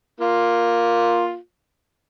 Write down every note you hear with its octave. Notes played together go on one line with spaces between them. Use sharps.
A#3 F4